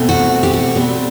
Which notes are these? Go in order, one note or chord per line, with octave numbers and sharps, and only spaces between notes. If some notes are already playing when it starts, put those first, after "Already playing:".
Already playing: B2 A3 C4
F#4
G4
F#4
B2 G3 C4